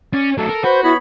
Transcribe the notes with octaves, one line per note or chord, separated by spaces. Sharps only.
C#4 D5
F#3 A3 A4
A#4
F#4 B4 C5 G6
B3 E4 C#5 B5